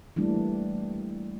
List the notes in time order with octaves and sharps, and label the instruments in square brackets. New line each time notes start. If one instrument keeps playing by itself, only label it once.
[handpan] E3 G3 A3 A#3 D4